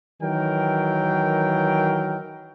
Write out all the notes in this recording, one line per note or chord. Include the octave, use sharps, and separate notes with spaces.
D#3 E3 F#3 A#4 G5